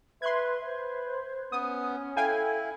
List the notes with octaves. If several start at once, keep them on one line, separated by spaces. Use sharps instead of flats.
B4 E5 C6 F#6 G#6
B4 C5
B3 C#4 D#6
E4 A4 F5 G5 G#5